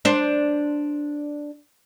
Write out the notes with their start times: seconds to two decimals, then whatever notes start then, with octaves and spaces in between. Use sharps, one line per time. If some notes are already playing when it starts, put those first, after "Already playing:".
0.05 D4 C5